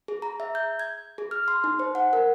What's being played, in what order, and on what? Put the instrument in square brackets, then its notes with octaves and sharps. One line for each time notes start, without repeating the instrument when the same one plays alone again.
[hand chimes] G#4
A#5
E5
G6
G#6
G#4
F6
C6
D#4
C5
F#5
A#4